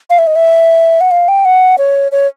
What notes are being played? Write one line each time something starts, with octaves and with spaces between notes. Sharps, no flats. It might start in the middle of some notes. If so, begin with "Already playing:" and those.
F5
E5
D#5
E5
F#5
F5
G5
F#5
C#5
C#5